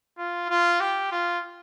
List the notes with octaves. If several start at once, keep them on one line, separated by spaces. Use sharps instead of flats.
F4
F4
G4
F4